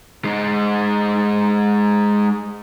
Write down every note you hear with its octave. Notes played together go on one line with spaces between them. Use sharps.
G#3 D#4